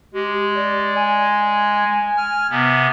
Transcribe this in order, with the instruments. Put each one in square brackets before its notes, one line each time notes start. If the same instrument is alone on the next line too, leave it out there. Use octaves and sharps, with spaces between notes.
[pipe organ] G#3 [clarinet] G4
[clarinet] D5
G#5
[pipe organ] F6
C3 B3